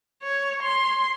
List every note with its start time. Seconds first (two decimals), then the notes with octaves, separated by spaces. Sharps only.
0.23 C#5
0.62 C6